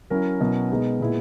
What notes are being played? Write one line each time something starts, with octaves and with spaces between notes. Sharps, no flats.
F#3 C#4 E4 A#4
B2 F#3 C#4 E4
B2 G#3 B3 D#4
A#2 G#3 B3 E4